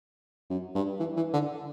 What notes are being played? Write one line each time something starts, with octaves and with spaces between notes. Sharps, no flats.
F#2
G2
E3
E3
D3